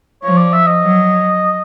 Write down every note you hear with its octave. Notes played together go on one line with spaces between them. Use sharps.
F3 C#5
D5
E5
D#5
F#3